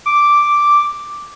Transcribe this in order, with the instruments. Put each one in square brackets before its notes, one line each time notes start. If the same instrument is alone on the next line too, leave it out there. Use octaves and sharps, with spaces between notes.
[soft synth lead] D6